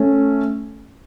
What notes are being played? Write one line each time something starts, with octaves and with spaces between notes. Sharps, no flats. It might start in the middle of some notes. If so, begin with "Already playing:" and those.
Already playing: A3 C#4